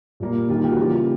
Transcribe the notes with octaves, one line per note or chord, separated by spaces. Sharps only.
A#2 G3 A#3
D#3 G3 A#3 F4 G4
G4
F#4
C#3 E3 G3 A#3 F4 G4